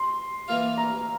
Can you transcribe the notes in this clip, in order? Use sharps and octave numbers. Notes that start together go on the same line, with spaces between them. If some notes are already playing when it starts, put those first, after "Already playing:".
Already playing: C6
E3 A#3 F4
A#5